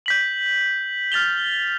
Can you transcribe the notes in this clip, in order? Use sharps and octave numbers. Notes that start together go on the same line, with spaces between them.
G6 B6 F#7
F6 A6 F7 G7